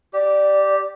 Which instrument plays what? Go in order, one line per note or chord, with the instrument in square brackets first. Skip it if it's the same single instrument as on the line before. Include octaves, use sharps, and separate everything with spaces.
[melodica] G4 [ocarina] D5